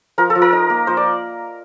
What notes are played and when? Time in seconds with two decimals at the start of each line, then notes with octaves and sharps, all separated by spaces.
0.18 F3 A#4
0.30 A4
0.35 F3
0.42 A#4
0.53 D#4
0.70 A#3
0.87 F3 C5
0.97 D5